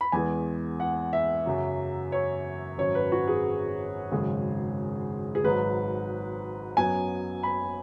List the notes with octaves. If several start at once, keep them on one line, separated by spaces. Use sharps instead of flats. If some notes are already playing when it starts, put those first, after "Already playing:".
B5
E2 E3 G#3 B3 G#5
F#5
E5
F#2 C#3 F#3
C#5
G#1 F#2 F#3 C#5
B4
F#4
G#4
G#1 F#2 C#3 G#3
G#4
G#1 G#2 F#3 B4
F#2 F#3 B3 G#5
B5